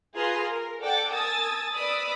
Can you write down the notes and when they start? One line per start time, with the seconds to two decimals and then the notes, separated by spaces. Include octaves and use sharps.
0.16 F4 G#4 B4 A#5 C6
0.47 A#4
0.81 A4 D5 F#5 G5 D6 A6
1.11 A#4 G#5 A5 D#6 E6 A6
1.74 B4 D5 B5 D#6 E6